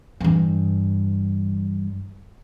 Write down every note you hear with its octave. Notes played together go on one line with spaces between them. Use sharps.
G2 E3